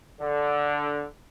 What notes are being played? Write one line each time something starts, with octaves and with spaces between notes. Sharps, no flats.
D3